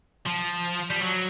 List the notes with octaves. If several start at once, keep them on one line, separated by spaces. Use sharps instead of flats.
F3
G3
F#3